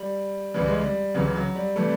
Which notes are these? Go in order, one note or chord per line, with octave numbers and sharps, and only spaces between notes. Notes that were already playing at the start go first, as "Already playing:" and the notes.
Already playing: G3
C#2 C#3 E3 G3
G#3
G3
C#2 C#3 E3 F#3
F#3
G3
C3 E3 G3 A3